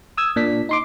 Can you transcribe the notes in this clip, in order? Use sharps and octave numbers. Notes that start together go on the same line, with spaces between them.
D#6 E6 G#6
A#2 D4 B6
D#4 C6 D6